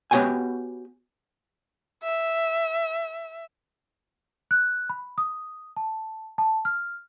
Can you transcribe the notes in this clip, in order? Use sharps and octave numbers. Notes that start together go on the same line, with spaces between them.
B3 F#4 G4 C#5 G5 G#5
E5
F#6
B5
D#6
A5
A5
F6